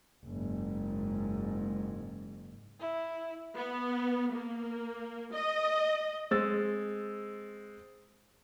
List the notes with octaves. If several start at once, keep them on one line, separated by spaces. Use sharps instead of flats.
F#1 G#2
E4
B3
A#3
D#5
G#3 C4 E6 A6